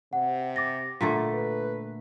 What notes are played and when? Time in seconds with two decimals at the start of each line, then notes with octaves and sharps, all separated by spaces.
0.13 C3 F#5
0.56 D6 A6 A#6
1.01 A#2 D3 A3 B6
1.33 B4